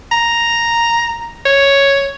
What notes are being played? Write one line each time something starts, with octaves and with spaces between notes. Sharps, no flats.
A#5
C#5